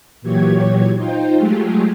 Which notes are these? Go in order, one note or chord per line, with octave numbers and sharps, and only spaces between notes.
A#2 E3 F#3 G4 C#5 G#6
D#4 F4 C5 G5
F#3 G#3 A3 F4 G4 G#4